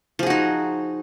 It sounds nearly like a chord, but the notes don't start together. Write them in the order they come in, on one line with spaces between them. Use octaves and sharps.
F3 G#4 F#4 D#4